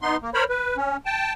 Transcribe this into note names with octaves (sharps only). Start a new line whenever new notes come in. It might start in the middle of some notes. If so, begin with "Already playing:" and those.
B3 D#4 C6
A#3
A#4 C5 C#5 B5
B4
C#4
G5 A5